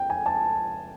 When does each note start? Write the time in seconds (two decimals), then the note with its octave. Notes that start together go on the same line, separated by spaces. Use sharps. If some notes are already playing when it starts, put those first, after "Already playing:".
Already playing: G5
0.10 G#5
0.26 A5